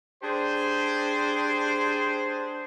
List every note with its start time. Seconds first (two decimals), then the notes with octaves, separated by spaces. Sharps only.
0.23 D4 G4 G#4 C5